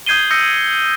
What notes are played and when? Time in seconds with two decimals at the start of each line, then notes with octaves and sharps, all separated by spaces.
0.06 D#6 G6 G#6 C7 D#7 G7
0.31 D#6 E6 G6 A#6 C#7